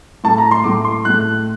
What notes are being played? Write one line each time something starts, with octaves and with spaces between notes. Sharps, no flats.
A2 A3 A5
A#5
C6
A2 A3 D6
C6
A2 A3 F#6